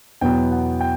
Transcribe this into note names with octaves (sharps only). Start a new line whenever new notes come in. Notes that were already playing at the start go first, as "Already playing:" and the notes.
E2 B2 F#3 B3 G5
F#5
G5